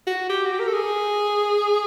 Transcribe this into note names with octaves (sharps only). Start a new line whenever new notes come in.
F#4
G4
F#4
G4
A#4
A4
G#4